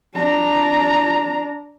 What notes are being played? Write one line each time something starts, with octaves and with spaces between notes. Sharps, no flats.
D4 A#5